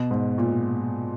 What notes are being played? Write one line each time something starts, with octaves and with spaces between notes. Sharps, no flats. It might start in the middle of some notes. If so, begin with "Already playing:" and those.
Already playing: B2
G#2
A#2